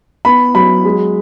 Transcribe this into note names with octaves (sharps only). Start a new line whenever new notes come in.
B3 B5
F#3 B5
G#3